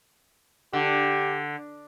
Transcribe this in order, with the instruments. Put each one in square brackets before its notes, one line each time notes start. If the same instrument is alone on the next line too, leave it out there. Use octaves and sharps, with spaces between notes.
[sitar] D3 [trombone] G4